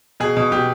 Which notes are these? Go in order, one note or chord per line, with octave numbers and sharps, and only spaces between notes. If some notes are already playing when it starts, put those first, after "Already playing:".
B2 G#4
B2
B2 G4